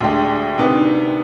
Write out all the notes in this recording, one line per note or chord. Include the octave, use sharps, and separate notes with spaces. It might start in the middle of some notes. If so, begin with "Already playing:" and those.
D2 D3 G#3 D4 G4
C3 D#3 B3 D4